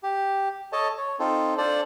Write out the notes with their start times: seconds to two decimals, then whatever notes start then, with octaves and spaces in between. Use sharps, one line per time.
0.03 G4
0.72 A4 C#5 D#5 A5
0.97 C#5
1.19 C4 D#4 F4 A4
1.58 D4 F4 A4 C5 D5